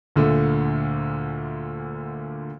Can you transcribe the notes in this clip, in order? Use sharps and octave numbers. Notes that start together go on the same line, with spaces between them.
D2 A#2 D3 A3